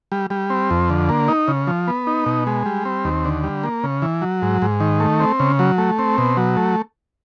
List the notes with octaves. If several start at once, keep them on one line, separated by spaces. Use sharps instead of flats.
G3
G3
C4
F2
D3
A#3
D#4
C#3
F3
B3
D#4
B2
G#3
G3
C4
D#2
D3
G3
A#3
C#3
E3
F#3
G#2
G#2
D#3
A3
C4
C#3
F#3
A3
C4
B2
F#3
A3